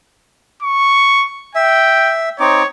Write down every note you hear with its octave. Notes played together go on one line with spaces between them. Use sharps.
C#6
E5 G5
C4 D#4 C#5 D6